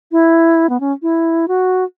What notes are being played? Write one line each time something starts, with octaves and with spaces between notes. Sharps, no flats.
E4
B3
C#4
E4
F#4